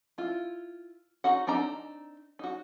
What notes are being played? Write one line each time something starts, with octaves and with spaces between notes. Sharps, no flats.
E4 F4
D#4 F#4 F#5
C4 D4 D#4 A#5
D#4 F#4